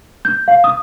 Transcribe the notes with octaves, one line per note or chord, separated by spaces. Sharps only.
G6
F5
D#6